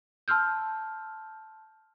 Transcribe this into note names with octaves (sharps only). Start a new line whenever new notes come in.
A5 C6 E6 F6 G6